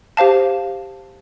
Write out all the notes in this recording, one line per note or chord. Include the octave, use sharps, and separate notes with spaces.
G4 C5 F5 A5